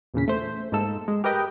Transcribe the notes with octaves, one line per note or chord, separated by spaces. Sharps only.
E2 A#2 C#3 B6
A3 C5
G#2 A#3 D#4 A4 E6
G#3
G4 A#4 B4 D#5 G5